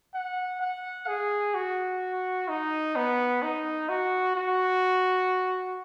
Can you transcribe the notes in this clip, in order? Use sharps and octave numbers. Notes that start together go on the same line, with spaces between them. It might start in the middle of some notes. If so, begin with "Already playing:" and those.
F#5
F#5
G#4
F#4
D#4
B3
D#4
F#4
F#4